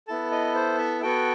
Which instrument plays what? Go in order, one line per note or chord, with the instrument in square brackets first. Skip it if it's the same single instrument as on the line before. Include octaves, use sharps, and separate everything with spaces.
[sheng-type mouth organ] B3 E4 A4 A5
D#5
C5
E5
B3 F#4 A4 G5